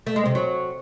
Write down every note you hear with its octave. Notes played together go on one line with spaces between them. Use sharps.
A3
G#3
C3
F#3